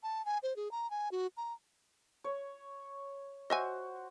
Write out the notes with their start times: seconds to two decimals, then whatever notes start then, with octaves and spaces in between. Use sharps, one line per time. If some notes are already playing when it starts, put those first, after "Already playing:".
0.03 A5
0.26 G#5
0.43 C5
0.56 G#4
0.71 A#5
0.91 G#5
1.12 F#4
1.37 A#5
2.24 C#5
3.50 F#4 C5 D#5 E5 G#5